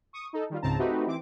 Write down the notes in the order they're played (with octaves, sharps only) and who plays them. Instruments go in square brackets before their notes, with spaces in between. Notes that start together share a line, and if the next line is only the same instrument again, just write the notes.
[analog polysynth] C#6 D#6
D#4 A4
D#3 G3 F4
C#2 G#2 C#3 C4 A5 A#5
A3 C4 D#4 F#4 G4 B4
E3 C4 D6